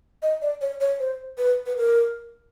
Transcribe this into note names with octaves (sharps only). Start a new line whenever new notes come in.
D#5
D5
C#5
C#5
C5
B4
B4
A#4